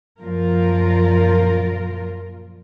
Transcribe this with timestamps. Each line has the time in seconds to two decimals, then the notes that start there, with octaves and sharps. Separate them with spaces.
0.21 F#2 A#2 F3 F4 A#4